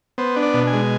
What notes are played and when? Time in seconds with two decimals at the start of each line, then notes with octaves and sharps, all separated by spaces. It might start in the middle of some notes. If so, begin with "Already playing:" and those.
0.18 B3 C5
0.36 D4
0.43 D5
0.54 B2
0.67 G#5
0.73 G#3